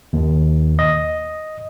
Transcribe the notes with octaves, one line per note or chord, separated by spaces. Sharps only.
D#2
D#5